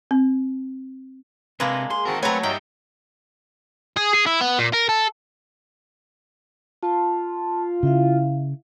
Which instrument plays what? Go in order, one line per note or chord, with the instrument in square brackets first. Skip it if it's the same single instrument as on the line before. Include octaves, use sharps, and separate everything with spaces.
[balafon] C4
[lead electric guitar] C3 [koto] G#3 A#3 [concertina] D4 [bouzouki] B4
[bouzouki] G#4 [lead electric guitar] C6
[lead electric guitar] D#3 A#4 [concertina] C4 F#4 A5
[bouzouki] F#3 C#5 [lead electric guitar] A3 [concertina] C4 B4 F#5 [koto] G#5 A#5
[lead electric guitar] G2 G3 [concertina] D#4 D#5 E5 [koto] G5
[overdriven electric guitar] G#4
G#4
E4
B3
A#2
A#4
A4
[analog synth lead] F4 [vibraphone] A5
[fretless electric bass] C#3 [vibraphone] E4 E5 F5